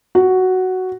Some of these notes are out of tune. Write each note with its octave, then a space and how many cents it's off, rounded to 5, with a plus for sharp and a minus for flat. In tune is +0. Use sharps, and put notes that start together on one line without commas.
F#4 +5